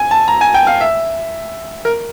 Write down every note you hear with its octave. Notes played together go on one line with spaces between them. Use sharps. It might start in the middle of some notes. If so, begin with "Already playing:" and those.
Already playing: G#5
A5
A#5
G#5
G5
F5
E5
A#4